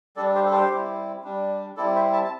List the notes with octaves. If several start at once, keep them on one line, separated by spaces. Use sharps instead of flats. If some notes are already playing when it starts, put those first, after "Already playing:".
G3 D4 A4 D5
G4 C5
A4
G4 C5
G3 C4 E4
G3 D4
G3 C4 E4 A4 D5
C5 E5
E5 A5
A5